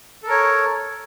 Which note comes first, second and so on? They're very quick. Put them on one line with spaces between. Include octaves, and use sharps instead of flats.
A4 A#4 C#5